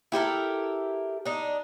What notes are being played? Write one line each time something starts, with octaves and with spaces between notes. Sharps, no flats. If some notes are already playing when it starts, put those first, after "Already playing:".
E4 G4 A4 A#4
D4 D#4